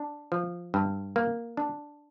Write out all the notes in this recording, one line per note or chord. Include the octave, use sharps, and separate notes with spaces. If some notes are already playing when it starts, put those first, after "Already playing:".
Already playing: D4
F3
G2
A#3
D4